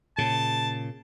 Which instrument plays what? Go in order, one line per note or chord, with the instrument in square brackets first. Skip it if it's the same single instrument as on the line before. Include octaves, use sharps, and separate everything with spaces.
[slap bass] A#2 C#3 [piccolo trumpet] A5